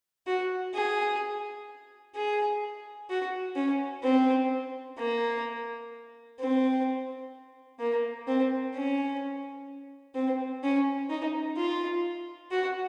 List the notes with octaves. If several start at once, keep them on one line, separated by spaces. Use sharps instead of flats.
F#4
G#4
G#4
F#4
C#4
C4
A#3
C4
A#3
C4
C#4
C4
C#4
D#4
F4
F#4